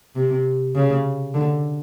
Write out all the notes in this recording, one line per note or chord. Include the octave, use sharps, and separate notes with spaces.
C3
C#3
D3